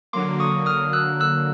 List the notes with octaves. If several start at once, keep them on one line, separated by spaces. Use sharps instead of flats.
D3 F#3 A#3 C6 D6
C#6 D#6
D#6 F6
E6 F#6
E6 F#6